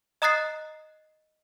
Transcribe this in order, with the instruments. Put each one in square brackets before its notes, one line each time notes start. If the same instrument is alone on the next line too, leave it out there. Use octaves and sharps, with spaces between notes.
[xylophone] D#5 A#5 D#6 F#6 A6 C7